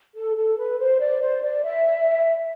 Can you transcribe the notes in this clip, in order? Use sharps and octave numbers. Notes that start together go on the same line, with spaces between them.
A4
A4
B4
C5
D5
C5
D5
E5